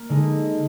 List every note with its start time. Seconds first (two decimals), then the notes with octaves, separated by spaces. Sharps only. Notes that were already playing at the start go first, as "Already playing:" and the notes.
Already playing: A#3
0.09 D3 G#3 D#4